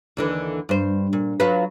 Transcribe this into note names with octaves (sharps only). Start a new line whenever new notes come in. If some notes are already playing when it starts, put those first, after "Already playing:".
D#2 D3 E3
G2 C5
A#2
F#3 F4 B4